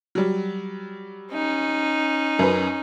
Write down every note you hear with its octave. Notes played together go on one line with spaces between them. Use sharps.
F#3 G3
C#4 D#4
F#2 B4